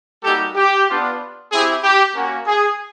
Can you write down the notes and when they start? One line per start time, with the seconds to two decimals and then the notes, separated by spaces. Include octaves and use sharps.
0.23 G3 A#3 D#4 F#4 G4 A4
0.55 G4
0.88 B3 D4 F4
1.50 C4 E4 G4 G#4
1.83 G4
2.14 A#3 C#4 F#4
2.47 G#4